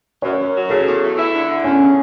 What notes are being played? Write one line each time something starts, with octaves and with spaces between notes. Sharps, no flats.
F#2 C#5
F#2
F#3
C#3 A4
E2
A3
E4
D3
D3
E2 C#4
C#3